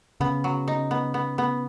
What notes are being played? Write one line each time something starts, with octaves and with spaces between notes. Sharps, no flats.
C#3 B3
F#3
D#4
B3
B3
B3